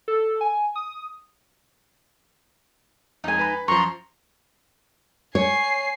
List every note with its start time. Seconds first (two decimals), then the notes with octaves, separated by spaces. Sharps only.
0.08 A4
0.41 G#5
0.76 D#6
3.24 F2 G#3 D#4 G#5
3.39 B4 B5
3.68 F#2 F3 A#5 C6 C#6
5.35 C#5 G#5 C7